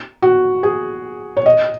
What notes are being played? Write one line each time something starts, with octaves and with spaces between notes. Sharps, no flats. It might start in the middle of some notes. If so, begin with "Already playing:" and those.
F#4
G#4
C#5
D#5